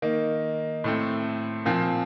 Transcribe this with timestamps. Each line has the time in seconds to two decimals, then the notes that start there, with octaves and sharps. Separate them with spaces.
0.02 D#3 A#3 D#4
0.84 A2 A3 C4
1.65 A#2 F3 C4